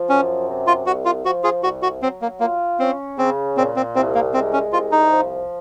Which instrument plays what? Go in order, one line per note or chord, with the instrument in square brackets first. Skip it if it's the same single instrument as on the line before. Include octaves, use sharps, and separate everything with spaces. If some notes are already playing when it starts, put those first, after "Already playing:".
Already playing: [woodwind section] F3
[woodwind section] F#2 [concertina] C#4
[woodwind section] C3
[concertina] F4
[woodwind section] C2 [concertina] F#4
[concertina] F4
[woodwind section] F3 [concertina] F#4
[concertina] F4 G#4
[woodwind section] C2 [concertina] F#4
[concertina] F#4
[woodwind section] F#3 [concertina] C4
[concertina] A#3
[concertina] A#3 [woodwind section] F4
[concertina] C4 [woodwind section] C#4
[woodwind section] C#3 [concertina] C4
[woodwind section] A#2 [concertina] C4
[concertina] C4
[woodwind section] C2 [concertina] C4
[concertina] A#3
[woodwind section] G#3 [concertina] C4
[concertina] C#4
[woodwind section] C2 [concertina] F4
[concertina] D#4
[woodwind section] F3